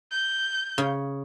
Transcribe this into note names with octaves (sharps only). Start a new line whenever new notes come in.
G6
C#3